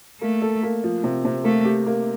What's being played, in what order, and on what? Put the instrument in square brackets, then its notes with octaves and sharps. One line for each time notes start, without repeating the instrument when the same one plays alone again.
[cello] A3 [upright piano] A#3
[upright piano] A4
A#3
F3
C3
C3
[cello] A3 [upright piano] A#3
[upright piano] G4
A#3